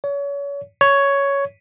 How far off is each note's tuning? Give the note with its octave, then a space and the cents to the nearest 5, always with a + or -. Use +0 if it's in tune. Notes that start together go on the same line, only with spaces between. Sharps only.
C#5 +35
C#5 +10